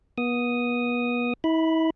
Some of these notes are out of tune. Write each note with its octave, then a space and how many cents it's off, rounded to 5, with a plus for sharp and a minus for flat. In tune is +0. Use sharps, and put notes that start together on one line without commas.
B3 -35 D#6 +0
E4 -40 B5 +0